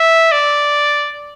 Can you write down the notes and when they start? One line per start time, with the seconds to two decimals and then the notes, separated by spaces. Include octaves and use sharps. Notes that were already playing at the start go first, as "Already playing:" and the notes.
Already playing: E5
0.32 D5